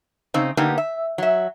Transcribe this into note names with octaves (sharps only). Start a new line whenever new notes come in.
C#3 C4 D#4
D3 A#3 B3 D#4 G4
E5
F#3 E5